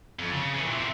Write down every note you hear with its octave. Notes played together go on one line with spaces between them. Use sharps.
F2
C#3
E3 C#4
A#2 E3
E2 C4